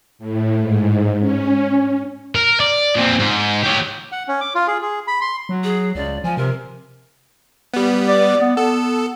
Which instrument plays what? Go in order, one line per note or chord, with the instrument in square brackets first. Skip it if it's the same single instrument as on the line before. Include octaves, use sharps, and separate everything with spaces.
[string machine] A2
G#2
C#4
[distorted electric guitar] A#4
D5
A#2 C4
G#2
G4 C#5
[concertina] F#5
C#4
D6
F4
G#4
G#4
B5
C6
[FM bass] F#3
[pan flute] G#4
[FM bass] C#2 [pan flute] D5
[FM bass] F3 [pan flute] G#5
[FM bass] C3 [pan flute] A#4
[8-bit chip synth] G3 B3
[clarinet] D5
B3
[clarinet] B3 [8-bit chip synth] A4